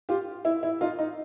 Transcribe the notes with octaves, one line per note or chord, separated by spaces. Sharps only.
F4 G4
E4
E4
D#4 F4
D#4